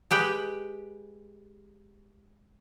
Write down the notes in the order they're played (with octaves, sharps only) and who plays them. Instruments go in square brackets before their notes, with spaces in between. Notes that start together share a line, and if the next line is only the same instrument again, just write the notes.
[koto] G#3 G4 B4 G5